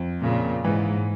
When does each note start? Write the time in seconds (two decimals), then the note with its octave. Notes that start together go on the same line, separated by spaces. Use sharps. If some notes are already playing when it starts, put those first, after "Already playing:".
Already playing: F2
0.23 A#2 C#3
0.64 G#2 E3